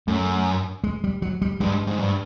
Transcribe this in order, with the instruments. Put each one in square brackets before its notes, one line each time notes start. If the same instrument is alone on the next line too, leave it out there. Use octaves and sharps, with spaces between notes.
[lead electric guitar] F#2 [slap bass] A3
[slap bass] G#3
G3
F#3
G3
[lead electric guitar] G2 [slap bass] G#3
[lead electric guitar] G#2
G2